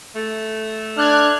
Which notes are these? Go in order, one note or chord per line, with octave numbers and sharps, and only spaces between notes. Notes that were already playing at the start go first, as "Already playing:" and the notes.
A3
D4 F6 F#6 G#6